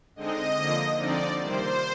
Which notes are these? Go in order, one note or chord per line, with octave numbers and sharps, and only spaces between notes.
D3 G#3 C4 D#4 D#5
D3 F3 A#3
D3 F3 C4 D#4 D5
C3 D#3 G3 A#3 C5